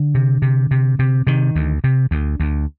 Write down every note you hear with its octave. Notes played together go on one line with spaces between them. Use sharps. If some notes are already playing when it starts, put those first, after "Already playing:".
Already playing: D3
C3
C3
C3
C3
C3 D#3
D2
C3
D2
D2